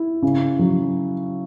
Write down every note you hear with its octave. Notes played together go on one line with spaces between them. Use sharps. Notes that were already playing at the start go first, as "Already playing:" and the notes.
Already playing: E4
C#3
F#3